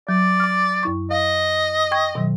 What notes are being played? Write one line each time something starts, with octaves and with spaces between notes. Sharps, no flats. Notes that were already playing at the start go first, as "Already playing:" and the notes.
F#3 D5
D6 F6
F#2 E4 C#6
D#5 F5
G5 C#6 G#6
B2 D#3 F#3